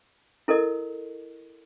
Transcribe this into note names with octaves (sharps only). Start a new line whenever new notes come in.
E4 A4 A#4 D#5